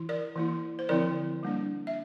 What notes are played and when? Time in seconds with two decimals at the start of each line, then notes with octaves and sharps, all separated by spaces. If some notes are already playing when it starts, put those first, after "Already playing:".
Already playing: E3 E4
0.09 A#4 D5
0.36 E3 A#3 E4
0.79 C5
0.89 D3 F3 C4 E4 A#4 D5
1.43 G3 A#3 D4
1.87 E5